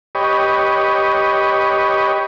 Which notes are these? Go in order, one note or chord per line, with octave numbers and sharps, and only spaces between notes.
G4 B4 C#5 D#5